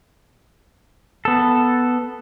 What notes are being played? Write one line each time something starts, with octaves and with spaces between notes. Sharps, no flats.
B3 A4